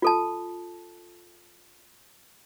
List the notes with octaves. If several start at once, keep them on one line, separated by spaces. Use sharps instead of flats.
F4 A4 A5